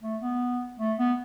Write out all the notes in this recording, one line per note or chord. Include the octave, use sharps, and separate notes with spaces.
A3
B3
A3
B3